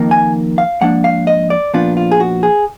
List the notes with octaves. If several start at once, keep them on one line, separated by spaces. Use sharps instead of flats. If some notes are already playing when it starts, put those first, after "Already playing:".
Already playing: F2 D#3 A#3 D#4
G#5
F5
G#2 F3 A#3 D4 F#5
F5
D#5
D5
A#2 F3 B3 D4 F4
F4
G#4
F#4
G#4